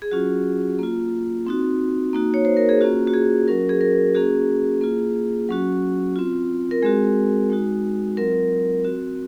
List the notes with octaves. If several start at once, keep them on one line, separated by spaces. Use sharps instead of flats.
G#4
F#3 C#4 F4 F#4
A#3 F4
C4 D#4 F#4
A#3 D#4 F#4
C#5
C5
A#4
G#4
A#3 C#4 F4 F#4
F#4
G#4
F#3 C#4 F#4 A#4
G#4
A#4
A#3 C#4 F#4 G#4
A#3 F4
F#3 C#4 F#4
C4 F4
A#4
G#3 C4 F#4 G#4
G#3 D#4 F#4
F#3 C4 F4 A#4
C4 F#4